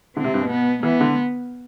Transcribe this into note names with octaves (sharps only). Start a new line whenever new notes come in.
D3 C4
C3
G2
B2
B3
E3 B3
D3